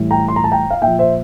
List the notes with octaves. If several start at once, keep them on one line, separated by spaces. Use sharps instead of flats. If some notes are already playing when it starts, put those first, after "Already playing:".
Already playing: A2 E3 G3
G5 A#5
C6
A#5
A5
G5 A#5
F5
A#2 F3 E5 G5
C5 E5